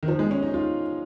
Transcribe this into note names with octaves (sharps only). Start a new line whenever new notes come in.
D#3
F3
G#3
C#4
D#4
F4